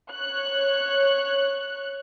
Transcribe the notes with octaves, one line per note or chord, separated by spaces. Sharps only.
C#5 F#6